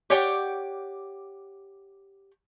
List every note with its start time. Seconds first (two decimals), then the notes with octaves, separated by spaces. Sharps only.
0.10 G4 C#5 D5 F#5 G5